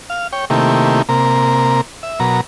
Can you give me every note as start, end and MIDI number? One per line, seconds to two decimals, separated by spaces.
0.10 0.27 77
0.33 0.45 73
0.33 0.45 79
0.50 1.02 48
0.50 1.02 51
0.50 1.02 57
0.50 1.02 58
0.50 1.02 64
0.50 1.02 67
1.09 1.81 48
1.09 1.81 58
1.09 1.81 70
2.03 2.20 76
2.20 2.41 47
2.20 2.41 54
2.20 2.41 70
2.20 2.41 82